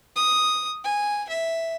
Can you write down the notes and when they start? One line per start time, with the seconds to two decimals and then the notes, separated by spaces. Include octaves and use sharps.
0.16 D#6
0.84 G#5
1.29 E5